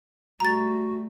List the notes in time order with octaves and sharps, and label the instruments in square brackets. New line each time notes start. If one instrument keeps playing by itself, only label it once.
[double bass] G3 A3 [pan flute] F#4 [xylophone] A#5 A6